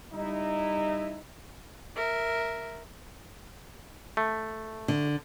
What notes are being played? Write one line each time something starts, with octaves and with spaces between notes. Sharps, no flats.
G3 D#4 E4
A#4 E5
A3
D3